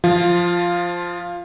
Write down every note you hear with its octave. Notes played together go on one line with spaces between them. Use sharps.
F3 F4